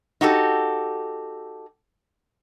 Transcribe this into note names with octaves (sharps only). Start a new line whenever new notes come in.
D#4 F#4 G4 A4